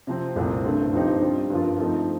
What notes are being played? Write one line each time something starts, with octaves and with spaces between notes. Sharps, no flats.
C3 F3 C4
C2 A#2 A3 C4
G2 D3 A3 C4
G2 F3 C4 D#4 G4
D3 G3 C4 F4
G2 D3 F3 A#3 F4
F3 A3 C4 D#4